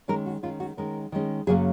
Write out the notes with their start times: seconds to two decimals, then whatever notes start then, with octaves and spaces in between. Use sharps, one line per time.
0.08 D#3 G#3 C#4 A#4
0.26 F#4
0.43 D#3 G#3 C#4 F4
0.60 F#4
0.77 D#3 G#3 C#4 A#4
1.12 D#3 G#3 C#4
1.47 F#2 C#3 F#3 A#3 C#4 G#4